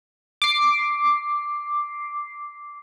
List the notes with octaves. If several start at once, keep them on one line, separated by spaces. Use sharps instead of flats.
D6 C7